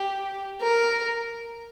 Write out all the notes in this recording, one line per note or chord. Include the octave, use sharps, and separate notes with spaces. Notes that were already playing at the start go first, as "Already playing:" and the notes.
Already playing: G4
A#4